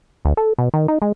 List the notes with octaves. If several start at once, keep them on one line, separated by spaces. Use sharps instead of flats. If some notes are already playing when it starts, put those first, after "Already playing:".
D2
A4
B2
D#3
D#4
G#3